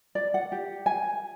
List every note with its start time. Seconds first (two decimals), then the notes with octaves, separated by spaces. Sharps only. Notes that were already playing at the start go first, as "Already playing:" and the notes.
0.15 D5
0.34 F#5
0.52 G4
0.86 G#5